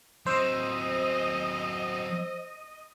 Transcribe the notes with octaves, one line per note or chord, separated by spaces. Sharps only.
F#3 C4 C5 D#5 E6